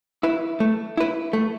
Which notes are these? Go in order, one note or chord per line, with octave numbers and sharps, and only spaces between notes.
E4 B4
A3
E4 B4
A3